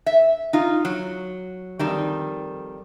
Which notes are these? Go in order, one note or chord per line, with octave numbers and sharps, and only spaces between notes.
E5
D#4 F4
F#3
F2 D#3 G3